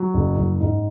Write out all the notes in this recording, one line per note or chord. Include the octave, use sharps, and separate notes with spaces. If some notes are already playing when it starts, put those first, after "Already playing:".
Already playing: F#3
F#1
F#1
G#2